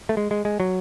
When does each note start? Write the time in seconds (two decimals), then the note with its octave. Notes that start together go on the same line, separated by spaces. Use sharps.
0.09 A3
0.17 G#3
0.31 G#3
0.45 G#3
0.60 F#3